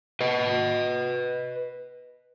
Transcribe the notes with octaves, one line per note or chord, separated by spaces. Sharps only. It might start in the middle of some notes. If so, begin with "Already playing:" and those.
B4 D#5